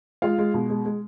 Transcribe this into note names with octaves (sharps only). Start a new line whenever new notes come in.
G#3 F4 F5
G#3
B2
G#3
G#3